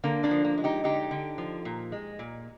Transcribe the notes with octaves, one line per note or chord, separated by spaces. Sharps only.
D3 A#3
A#3 D4
F3
A#3
G#3
D#4 G4
D3 D#4 G4
D3
F3
A#2
G#3
A#2